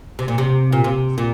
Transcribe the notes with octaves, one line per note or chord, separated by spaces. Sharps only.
C3
A#2
C3
A#2
C3
A#2